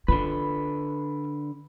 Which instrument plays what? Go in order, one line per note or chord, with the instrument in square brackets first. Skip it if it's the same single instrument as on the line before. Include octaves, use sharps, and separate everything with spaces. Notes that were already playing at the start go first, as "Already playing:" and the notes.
[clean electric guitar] D3 B4 [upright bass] F4